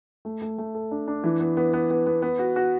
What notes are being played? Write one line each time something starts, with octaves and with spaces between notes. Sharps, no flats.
A3
A3
A3
A4
D4
D4
E3
B3
B3
B3
B3
B3
B3
F#4
F#4